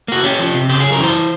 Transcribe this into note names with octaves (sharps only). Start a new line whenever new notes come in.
A#3 F#4
C#4 G4
F3
C3
C#3 G4
F#2 G#4
A#4
E3 C5